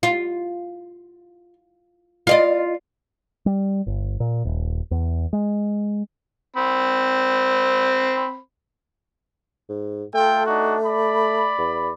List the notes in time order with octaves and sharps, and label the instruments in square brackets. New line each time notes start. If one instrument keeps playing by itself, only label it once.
[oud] F4
F4 D5 D#5
[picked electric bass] G3
G1
A#2
D#1
E2
G#3
[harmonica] C4 B5
[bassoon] G#2
[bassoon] A3 [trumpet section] F4 A4 G5
[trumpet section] D4 D#4 F#4
D5 B5
[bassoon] E2